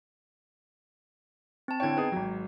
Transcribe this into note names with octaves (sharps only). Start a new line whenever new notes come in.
C4 A5
D3 E4 C#5 G5 G#6
B3 D#4 G#4
G#1 F#3